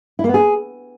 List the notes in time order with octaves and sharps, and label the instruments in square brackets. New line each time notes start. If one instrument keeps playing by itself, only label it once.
[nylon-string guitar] E4
A#3
B3
G#4